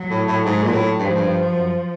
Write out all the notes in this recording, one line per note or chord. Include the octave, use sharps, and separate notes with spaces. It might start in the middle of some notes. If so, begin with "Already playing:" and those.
Already playing: F#3
A2
A2
G#2
A#2
A2
G2 F3
G#2
G2
F#2